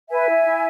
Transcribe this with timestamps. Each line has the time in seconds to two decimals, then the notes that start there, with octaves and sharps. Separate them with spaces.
0.10 B4 E5 G#5
0.28 E4
0.46 E4